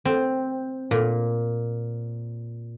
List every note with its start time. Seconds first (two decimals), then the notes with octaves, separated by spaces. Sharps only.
0.05 C4
0.91 A#2